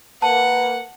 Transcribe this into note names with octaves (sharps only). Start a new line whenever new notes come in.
A#3 B4 F#5 A5